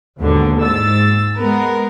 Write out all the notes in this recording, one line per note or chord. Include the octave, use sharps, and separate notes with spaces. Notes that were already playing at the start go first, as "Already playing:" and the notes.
D#2 G#2 B2 D3
G#2 E6 A6
G#3 B3 A#4